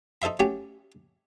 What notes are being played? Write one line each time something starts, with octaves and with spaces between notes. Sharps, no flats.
D#4 A4 C5 E5 B5
F#3 A3 C#4 G4